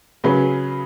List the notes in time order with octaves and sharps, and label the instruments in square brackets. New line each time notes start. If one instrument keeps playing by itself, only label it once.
[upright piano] C#3 F#3 C#4 G#4 B4